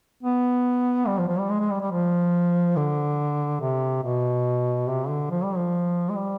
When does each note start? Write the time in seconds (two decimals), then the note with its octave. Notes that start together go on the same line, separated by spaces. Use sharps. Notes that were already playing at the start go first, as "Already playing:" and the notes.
0.23 B3
1.07 G3
1.18 F3
1.28 F3
1.39 G3
1.50 G#3
1.60 G#3
1.70 G3
1.81 G3
1.91 F3
2.76 D3
3.61 C3
4.03 B2
4.88 C3
5.09 D3
5.31 F3
5.43 G3
5.56 F3
6.09 G#3
6.15 G3